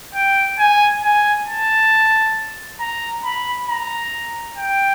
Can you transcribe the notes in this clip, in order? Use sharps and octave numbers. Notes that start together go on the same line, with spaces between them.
G5
G#5
G#5
A5
A#5
B5
A#5
G5